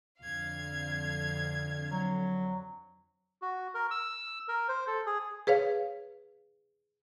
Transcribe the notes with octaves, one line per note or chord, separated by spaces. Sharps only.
F2 D3 F5 G#6
F#3
F#4
A#4
E6
A#4
C5
A4
G#4
G#4 B4 C#5 F5